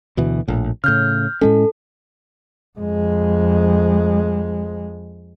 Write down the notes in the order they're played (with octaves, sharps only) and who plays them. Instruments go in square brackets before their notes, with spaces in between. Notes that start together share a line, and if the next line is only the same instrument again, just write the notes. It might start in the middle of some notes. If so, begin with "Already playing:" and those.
[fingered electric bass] D2 B2 E3
A#1 A2
[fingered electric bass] A2 C#3 [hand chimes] F6 G6
[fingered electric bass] A2 G#3 C#4 [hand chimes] A4
[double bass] F2 G#3